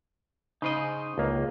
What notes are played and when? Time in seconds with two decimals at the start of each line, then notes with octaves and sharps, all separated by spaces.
0.62 C#3 D#4 C5 D#5
1.18 C#2 A#3